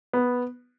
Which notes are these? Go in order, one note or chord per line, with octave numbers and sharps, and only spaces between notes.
B3